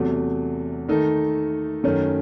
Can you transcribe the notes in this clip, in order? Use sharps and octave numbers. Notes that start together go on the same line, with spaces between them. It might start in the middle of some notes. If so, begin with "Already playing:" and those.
Already playing: E2 C3 F#3 A3
D#3 A3 D#4 A4
F#2 D#3 A3 C#4